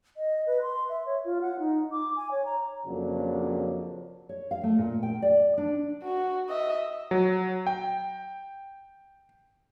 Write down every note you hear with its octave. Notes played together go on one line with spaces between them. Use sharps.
D#5
B4
C6
E5
C#5
F4
F#5
D#4
D6
G#5
C#5
A#5
F2 C#3 F#3 A#3 D4 A4
C#5
F5
A3
A#2
G5
D5
D4
F#4
D#5 E5
F#3
G5